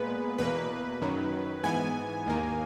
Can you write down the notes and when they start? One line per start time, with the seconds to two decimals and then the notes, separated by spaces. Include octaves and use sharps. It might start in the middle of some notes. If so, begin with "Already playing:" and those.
Already playing: A#2 G#3 B3 B4
0.38 E2 B2 A#3 B4
1.01 F#2 D#3 F#3
1.63 G#2 E3 B3 G#5
2.26 D#2 D#3 A#3